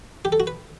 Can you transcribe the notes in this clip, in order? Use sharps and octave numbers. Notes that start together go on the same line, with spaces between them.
G4
A4
F#4
B4